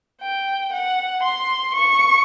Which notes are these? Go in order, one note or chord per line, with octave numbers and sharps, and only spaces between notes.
G5
F#5
C6
C#6